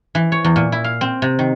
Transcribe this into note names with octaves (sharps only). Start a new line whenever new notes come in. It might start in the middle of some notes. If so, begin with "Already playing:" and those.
E3
C#5
E2
A#2
E4
F5
C4
C3
D#3